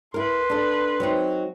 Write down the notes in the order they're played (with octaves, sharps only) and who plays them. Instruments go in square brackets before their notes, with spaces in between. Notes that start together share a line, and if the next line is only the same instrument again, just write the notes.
[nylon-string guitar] E4 A#4 [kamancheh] B4 C6
[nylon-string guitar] D4 A4
F#3 C4 D#4